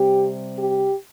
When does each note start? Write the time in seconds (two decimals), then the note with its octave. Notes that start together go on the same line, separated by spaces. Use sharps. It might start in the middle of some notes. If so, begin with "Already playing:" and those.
Already playing: C3 G3 C4 G4
0.58 G4